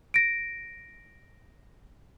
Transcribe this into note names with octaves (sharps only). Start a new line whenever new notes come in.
A#6 D7